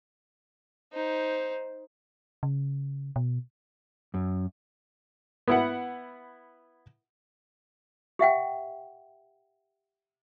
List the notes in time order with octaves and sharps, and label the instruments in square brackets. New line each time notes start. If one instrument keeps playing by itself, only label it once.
[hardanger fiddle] D#4 C5
[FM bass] C#3
B2
[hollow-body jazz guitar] F#2
[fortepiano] B3 E4 F#5
[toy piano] G4 E5 F#5 G5